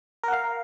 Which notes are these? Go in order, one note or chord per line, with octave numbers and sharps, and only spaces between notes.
A#4 F5 F#5